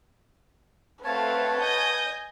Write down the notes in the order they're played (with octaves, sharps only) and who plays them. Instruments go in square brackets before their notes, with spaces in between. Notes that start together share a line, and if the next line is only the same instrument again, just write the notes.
[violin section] A3 C4 [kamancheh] B4 F#5 [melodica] C#5 A5 [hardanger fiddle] F5
[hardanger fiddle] D#5 [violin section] G#5 G6